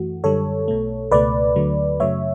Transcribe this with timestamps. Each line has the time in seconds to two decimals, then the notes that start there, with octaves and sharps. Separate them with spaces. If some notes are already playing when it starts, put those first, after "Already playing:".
Already playing: F#2 E3 A3 F#4
0.24 F#2 D3 G3 A4 C#5
0.68 B1 B2 A3
1.11 C#2 B2 A3 B4 D5
1.56 D2 D3 F#3 A3
2.00 F#2 C#3 F#3 A3 C#5 E5